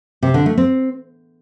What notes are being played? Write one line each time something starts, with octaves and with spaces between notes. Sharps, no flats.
C3
D3
A3
C4